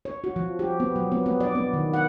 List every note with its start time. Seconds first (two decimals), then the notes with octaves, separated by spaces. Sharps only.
0.05 C#5
0.24 F#4
0.36 F3
0.59 G4
0.80 B3
0.96 F#3
1.12 B3
1.26 B3
1.40 D5
1.55 B3
1.73 D#3
1.93 F#5